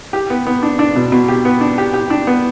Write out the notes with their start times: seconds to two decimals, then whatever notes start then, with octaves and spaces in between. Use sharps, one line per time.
0.13 G4
0.30 B3
0.47 B3
0.63 D4
0.79 D4
0.96 B2
1.12 B2
1.28 G4
1.45 B3
1.61 D4
1.78 G4
1.93 G4
2.10 D4
2.27 B3